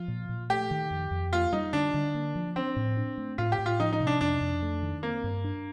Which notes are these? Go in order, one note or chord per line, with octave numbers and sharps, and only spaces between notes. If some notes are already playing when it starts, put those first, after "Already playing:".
Already playing: F3 F4
A#2
A#2
A3 G4
D#3
F2
F2
A#3 F4
G3 D#4
D3 D4
D3
A#3
F3
C4 D4
A2
D4
A3
A2 F4
G4
A2
F4
F3 D#4
D#4
C3
D4
F2 D4
F2
A3
D#3
A#3 C4
G2
D4